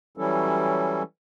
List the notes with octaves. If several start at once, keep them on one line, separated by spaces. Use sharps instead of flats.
E3 F#3 G3 C#4 E4 A4